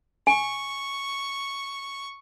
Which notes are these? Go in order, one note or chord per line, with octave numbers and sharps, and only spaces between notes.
G#5 C#6